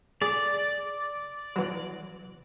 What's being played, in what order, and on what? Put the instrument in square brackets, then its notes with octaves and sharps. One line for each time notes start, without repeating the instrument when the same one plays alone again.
[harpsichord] G#4 [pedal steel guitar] D5
[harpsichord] E3 F#3